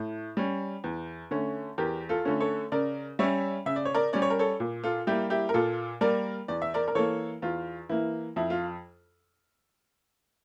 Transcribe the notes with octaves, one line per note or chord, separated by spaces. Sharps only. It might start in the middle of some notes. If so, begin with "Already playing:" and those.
Already playing: A2
G3 C#4
E2
D3 A3 C#4
E2 G4 A#4
F4 A4
D3 A3 C#4
A4 C#5
C#3 A#4 D5
G3 C#4 C#5 E5
C#3 E5
D5
C#5
A#4 D5
G3 C#4 D5
C#5
A#4
A4 C#5
A#2
F4 A4
G3 A#3 E4 G4
E4 G4
A#4
A#2 F4 A4
G3 A#3 A#4 D5
E2 D5
E5
A#4 D5
A#4
E3 A#3 A4 C#5
E2 F4
E3 A#3 E4
F2 E4
F4